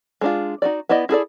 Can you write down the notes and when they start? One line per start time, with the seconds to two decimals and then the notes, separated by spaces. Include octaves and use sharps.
0.21 G#3 D4 F4
0.62 D#4 F#4 D5
0.89 B3 E4 D5 D#5
1.09 E4 G#4 A4 D5